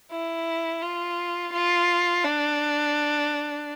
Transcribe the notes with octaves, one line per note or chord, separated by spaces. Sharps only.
E4
F4
F4
D4